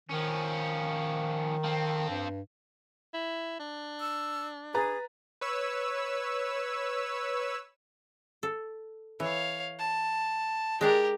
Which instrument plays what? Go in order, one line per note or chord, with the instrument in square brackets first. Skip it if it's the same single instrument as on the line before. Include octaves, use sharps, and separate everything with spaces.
[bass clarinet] D#3 [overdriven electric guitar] F3 C#4
[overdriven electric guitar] F3 C4
[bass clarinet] G2
[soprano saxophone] E4
D4
[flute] E6
[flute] G#4 [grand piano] B4 A#5 A6
[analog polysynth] B4 C#5 E6
[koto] A4
[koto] E3 [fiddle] C#5 F5
[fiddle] A5
[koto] G#3 D4 D5 [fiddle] G4 A#4